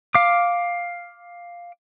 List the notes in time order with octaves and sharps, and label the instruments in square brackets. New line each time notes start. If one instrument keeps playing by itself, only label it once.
[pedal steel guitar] F5 D6